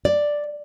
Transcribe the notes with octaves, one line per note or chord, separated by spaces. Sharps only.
D5